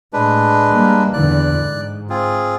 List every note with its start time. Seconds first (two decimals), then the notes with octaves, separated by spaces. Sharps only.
0.13 A2 G#3 D4 B4
0.70 G3 A#3
1.13 E2 D3 E3 D5 F#6
1.58 G#2
2.10 C4 F4 G#4